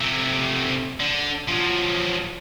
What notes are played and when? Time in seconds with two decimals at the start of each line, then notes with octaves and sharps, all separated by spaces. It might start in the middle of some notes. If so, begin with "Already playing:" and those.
0.01 C3 A3
1.00 D3
1.48 F3 F#3